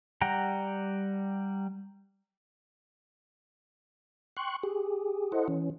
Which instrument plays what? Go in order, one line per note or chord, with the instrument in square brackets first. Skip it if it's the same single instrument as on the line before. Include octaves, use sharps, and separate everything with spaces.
[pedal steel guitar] G3 F#5 G5 A#5
[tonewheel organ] G5 C6 C#6 F#6
G4 G#4
E4 A4 C5 D#5 F#5
E3 C#4